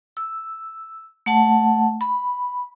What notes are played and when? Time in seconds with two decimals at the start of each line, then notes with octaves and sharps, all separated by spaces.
0.17 E6
1.26 A3 F#5 A5
2.01 B5